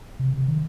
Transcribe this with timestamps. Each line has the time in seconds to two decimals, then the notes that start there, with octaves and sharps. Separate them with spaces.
0.19 C3
0.33 C3
0.48 D#3